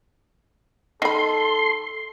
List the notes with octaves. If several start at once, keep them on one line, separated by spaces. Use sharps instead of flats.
D#3 A4 B5 C6